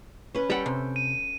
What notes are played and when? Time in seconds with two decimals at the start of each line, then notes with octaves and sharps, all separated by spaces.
0.35 C#4 B4
0.50 G3 A4 F#5 G5
0.66 C3
0.96 D#7